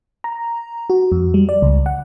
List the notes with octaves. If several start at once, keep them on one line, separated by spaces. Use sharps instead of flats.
A#5
F#4
F2
G3
D5
C#2
F#5